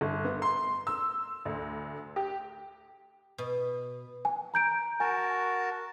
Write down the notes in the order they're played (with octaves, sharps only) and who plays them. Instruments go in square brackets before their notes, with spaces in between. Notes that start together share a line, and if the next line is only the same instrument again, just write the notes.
[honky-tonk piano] G1
B3
C6
E6
D2
G4
[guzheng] B2
[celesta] G#5
A#5 G6 D7
[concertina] F#4 A#4 A5 [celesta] G#5